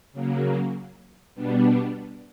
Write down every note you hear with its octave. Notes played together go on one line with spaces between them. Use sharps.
C#3 F#3 A#3
B2 G3 B3 D4